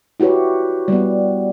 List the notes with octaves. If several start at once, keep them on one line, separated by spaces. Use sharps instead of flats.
E4 F#4 G4 B4 C#5
G3 B3